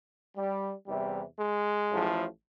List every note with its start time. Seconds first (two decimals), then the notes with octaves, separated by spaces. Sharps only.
0.36 G3
0.87 E2 C3 E3 G3
1.38 G#3
1.90 A1 A2 F3